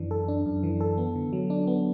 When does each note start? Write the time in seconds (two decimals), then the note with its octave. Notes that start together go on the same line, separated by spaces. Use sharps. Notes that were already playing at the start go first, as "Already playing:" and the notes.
Already playing: F#2 E3 D4
0.11 A4
0.28 D4
0.45 F#2
0.63 E3
0.80 A4
0.98 B3
1.15 D3
1.33 F#3
1.50 D4
1.67 B3